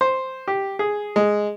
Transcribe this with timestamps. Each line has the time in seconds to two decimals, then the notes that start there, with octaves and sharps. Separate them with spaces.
0.01 C5
0.48 G4
0.79 G#4
1.16 G#3